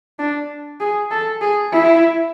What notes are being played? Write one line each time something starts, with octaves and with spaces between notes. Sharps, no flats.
D4
G#4
A4
G#4
E4